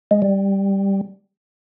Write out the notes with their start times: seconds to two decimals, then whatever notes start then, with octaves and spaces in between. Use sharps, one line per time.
0.11 G#3
0.22 G3